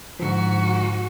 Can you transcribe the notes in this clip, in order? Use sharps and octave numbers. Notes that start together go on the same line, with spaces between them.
G#2 D3 F3 F#4